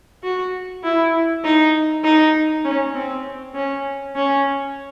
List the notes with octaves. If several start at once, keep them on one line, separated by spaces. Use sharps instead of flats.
F#4
E4
D#4
D#4
C#4
C4
C#4
C#4